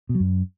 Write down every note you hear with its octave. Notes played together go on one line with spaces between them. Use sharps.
B2
F#3
F#2